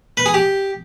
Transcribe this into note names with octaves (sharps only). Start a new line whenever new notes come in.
B4
G#4
G4